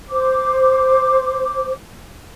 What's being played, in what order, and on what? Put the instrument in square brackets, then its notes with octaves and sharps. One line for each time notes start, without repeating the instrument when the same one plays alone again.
[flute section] C5 D6